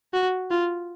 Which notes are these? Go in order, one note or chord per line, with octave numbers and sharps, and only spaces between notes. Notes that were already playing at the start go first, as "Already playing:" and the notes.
F#4
F4